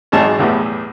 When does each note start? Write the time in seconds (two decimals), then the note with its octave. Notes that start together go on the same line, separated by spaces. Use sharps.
0.12 G#1 E2 G#2 F#3 G#4 A5
0.38 B1 E2 A2 B3 G4